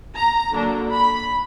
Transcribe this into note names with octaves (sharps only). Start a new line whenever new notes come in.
A#5
D3 F#3 A#3 D4
B5